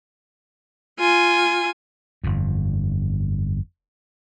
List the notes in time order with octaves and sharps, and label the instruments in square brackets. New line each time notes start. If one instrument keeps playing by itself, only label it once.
[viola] F4 G#5
[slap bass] G1 F2